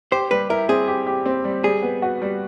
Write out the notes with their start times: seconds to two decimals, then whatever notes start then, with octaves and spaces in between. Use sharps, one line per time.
0.12 G4 C5
0.31 G3 B4
0.50 E4 A#4
0.69 C4 G#4
0.88 G4
1.07 G4
1.26 C4
1.44 G3
1.63 G3 G#4
1.83 B3
2.02 F#4
2.22 G3